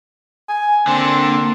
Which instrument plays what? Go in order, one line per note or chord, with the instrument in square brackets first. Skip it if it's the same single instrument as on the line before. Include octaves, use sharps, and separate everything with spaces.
[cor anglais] G#5
[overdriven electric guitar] D3 [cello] A#3 [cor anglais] C4